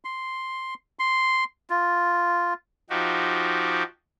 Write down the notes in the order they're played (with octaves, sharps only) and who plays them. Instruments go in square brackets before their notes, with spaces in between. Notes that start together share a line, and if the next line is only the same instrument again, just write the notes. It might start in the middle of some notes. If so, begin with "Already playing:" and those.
[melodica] C6
C6
F4
[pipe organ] F3 D#4 F#4 G4